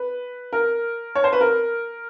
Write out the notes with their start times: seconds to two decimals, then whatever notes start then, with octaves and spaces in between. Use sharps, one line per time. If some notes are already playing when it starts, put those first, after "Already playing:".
Already playing: B4
0.53 A#4
1.15 C#5
1.24 C5
1.33 B4
1.41 A#4